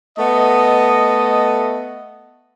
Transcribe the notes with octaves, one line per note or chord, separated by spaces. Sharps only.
A3 B3 D#5